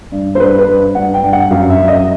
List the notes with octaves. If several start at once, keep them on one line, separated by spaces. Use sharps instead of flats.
G2
C5
G2 B4
B4
G2
G2 F#5
G5
G2
F#5
F#2 F5
E5
F#2
D#5